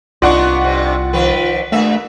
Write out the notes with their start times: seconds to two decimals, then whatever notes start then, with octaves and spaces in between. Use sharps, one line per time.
0.22 C2 B3 D4 D#4 F4 D5 F#5 C#6
0.61 G2 C3
1.13 D#3 F3 B4
1.72 G2 A3 A#3 E5